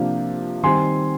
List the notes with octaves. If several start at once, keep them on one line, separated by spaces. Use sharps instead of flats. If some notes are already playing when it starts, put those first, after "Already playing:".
Already playing: C3 F3 A#3 D4
D#3 G3 C4 G#5 C6